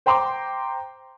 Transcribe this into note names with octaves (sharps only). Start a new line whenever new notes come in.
C5 G5 A#5 C6 D6